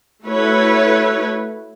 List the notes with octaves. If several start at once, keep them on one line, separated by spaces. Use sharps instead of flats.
A3 E4 F#4 B4 C#5